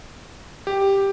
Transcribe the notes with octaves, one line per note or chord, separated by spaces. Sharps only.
G4